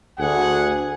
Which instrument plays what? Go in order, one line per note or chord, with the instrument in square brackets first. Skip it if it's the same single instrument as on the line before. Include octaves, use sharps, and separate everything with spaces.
[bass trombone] D2 [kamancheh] G#4 [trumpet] F#5